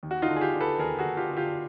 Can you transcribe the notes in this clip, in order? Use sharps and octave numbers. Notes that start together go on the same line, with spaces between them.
D#2
F#4
D#4 F4
D3
G#4
F4 G4
D3
A4 B4
D#2 G#4 A#4
F#4 G#4
D#2
F4 G4
D3
F4 G4